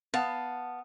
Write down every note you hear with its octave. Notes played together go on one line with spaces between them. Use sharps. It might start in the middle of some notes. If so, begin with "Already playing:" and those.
B3 F5 A5